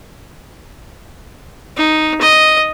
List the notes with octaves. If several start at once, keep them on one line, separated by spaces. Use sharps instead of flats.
D#4
D#5